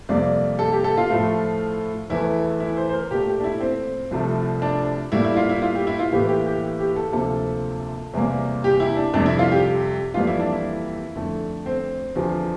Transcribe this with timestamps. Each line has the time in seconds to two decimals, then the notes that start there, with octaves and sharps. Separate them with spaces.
0.09 F2 C3 G3 A#3 D5
0.59 A4
0.72 G4
0.84 A4
0.97 F4
1.10 A2 F3 A3
2.10 E2 E3 A3 E4
2.60 E4
2.77 C5
2.89 C5
2.93 A#4
3.11 A#2 A3 G4
3.27 G4
3.40 D4
3.44 E4
3.60 C4
4.11 C2 C3 F3 A3
4.62 D4
5.12 A2 G3 A#3 E4
5.25 E4
5.36 F4
5.49 E4
5.62 F4
5.75 G4
5.87 E4
5.99 F4
6.12 A2 E3 A#3 G4
6.29 G4
6.46 G4
6.80 G4
6.96 A4
7.12 D2 C3 F3 A#3 A4
8.14 E2 C3 G3 A#3
8.64 G4
8.80 E4
8.97 D4
9.14 F2 C3 G3 D4
9.26 E4
9.39 F4
9.52 G4
10.14 F2 E3 G3 A#3 F4
10.27 E4
10.40 D4
10.52 E4
11.15 F2 D3 A3
11.66 C4
12.16 E2 D3 F3